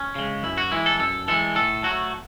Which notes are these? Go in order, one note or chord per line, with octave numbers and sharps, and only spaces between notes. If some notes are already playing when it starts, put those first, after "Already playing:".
Already playing: C#4
C#3 G#3
F#2 E4
F#4
E3 G#3 E4
A4
F#2 A4
E3 G#3 A4
A2 A4
F#3 A3 F#4